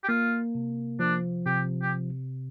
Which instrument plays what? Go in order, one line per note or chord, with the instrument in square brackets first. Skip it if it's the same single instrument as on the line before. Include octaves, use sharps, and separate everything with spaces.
[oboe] G4
[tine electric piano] A#3 [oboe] F4
[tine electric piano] C3
[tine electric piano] F3 [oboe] D4
[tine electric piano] C3 [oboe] G4
[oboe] G4